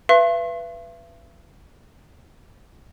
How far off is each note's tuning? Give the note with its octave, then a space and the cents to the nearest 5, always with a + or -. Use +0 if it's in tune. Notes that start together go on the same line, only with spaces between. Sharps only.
B4 +0 E5 +45 C6 +40